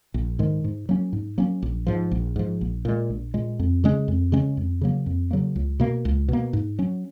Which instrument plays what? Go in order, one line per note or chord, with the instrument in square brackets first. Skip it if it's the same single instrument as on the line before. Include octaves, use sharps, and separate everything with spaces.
[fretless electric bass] A#1
G#2 D#3 G#3
G#2
F#3 A#3 C#4
G#2
F#3 A#3 C#4
A#1
G#2 F3
A#1
G#2 F3
A#1
A#2 G#3
A#1
A#2 G#3
F2
C#3 G#3 C#4
F2
C#3 G#3 C#4
F2
C#3 F#3 A#3
F2
C#3 F#3 A#3
C#2
B2 A#3
C#2
B2 A#3
G#2
F#3 C#4